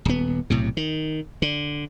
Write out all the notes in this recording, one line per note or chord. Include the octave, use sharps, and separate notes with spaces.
D#1 B3
B1 A2 C3
D#3
D3